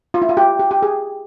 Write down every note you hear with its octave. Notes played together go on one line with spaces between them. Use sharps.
F4
E4
F4
G4
G4
G4
G#4